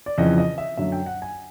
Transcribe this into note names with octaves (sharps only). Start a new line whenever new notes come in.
D5
F2 C#3 E3 D#5
D#5
E5
F#2 D3 F#3 E5
G5
F#5
G#5